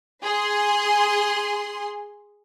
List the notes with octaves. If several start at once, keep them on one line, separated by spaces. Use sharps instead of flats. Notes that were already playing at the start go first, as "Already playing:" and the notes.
G#4 C6